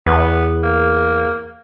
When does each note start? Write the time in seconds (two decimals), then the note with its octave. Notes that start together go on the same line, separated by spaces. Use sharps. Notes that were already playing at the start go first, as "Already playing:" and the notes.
0.06 E2 B3
0.63 A#3